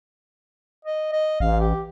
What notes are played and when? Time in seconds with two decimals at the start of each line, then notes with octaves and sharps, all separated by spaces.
0.84 D#5
1.13 D#5
1.40 A1 F5
1.60 G4